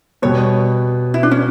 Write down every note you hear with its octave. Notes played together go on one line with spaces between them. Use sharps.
B2 G3 B3 C#5
E4
D4
C#4